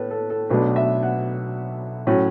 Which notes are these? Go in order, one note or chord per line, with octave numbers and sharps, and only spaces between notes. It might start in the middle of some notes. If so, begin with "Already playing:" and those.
Already playing: A2 A4 B4
A4
A4
B1 B2 A3 D4 B4
E5
F#5
A2 F#3 C#4